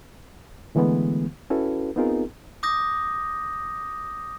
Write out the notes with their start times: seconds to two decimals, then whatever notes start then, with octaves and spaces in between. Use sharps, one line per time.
0.75 D3 E3 G#3 A3 B3
1.50 C#4 E4 F#4 A4 B4
1.96 B3 C4 D#4 F4 G#4 A#4
2.63 D6 D#6 G6 A#6